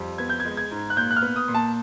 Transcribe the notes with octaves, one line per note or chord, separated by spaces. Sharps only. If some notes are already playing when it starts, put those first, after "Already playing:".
Already playing: F2 G3
B3 G#6
G6
G#6
G#3
G#6
G#2
F#6
A#2 G6
F#6
F6
B3
D#6
A#2
A5